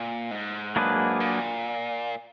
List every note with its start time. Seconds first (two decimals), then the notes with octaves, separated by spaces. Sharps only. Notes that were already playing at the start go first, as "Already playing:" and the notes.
Already playing: A#2
0.31 G#2
0.76 F#3 A#3 D4 G#4 B4
1.20 A#2